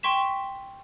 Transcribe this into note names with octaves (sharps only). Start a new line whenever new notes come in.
G5 C6 C#6 B6 E7